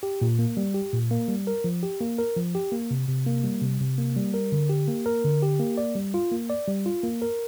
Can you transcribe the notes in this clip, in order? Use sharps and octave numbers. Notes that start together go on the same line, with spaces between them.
G4
A#2
A#3
G3
G4
A#2
A#3
G3
A#4
F3
G4
A#3
A#4
F3
G4
A#3
C3
C3
A#3
G3
C3
C3
A#3
G3
A#4
D3
G4
A#3
A#4
D3
G4
A#3
D5
G3
F4
A#3
D5
G3
F4
A#3
A#4